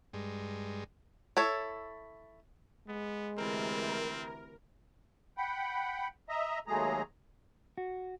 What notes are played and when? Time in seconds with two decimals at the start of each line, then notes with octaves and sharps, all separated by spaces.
0.13 G2 G#3
1.37 E4 A4 C#5
2.88 G#3 B3
3.38 D2 C3 E3 C4 A#4
5.37 F#5 G5 B5
6.29 D#5 E5 A#5
6.67 D#2 F#3 G#3 A3 G#4 A#5
7.78 F#4